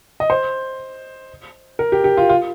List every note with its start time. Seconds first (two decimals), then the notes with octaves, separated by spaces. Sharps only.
0.20 D#5
0.30 C5
1.79 A#4
1.92 G4
2.04 G4
2.17 F4
2.29 F4